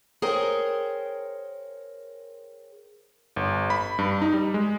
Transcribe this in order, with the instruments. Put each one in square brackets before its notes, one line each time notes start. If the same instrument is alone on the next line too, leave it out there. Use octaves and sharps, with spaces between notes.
[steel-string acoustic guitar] G#4 A#4 C5 C#5 G5
[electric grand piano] G1
B5
G2
D#4
G3
G#3